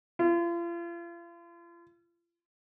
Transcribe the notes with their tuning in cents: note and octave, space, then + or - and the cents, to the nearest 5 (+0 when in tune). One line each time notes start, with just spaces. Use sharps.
F4 -40